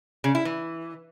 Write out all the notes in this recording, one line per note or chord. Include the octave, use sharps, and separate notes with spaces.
C#3
E4
E3